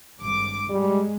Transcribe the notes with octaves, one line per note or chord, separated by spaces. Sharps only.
G#1 G2 D6
G#2 G3 G#3